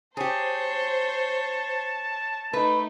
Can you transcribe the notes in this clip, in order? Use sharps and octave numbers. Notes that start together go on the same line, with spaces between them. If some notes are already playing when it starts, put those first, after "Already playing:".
G4 G#4 C5 C#5 A5
A3 D#4 B4